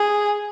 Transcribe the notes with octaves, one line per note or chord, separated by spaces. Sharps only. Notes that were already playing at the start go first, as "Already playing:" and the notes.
Already playing: G#4